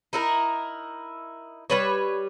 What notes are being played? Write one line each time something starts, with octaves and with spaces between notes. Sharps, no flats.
D#4 E4 A#4
G3 B4 C#5